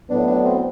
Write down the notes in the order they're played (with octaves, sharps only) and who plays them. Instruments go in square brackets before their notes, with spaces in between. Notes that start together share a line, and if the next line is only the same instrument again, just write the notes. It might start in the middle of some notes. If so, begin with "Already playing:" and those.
[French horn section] A2 F#3 B3 [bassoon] D4
[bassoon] D4
C4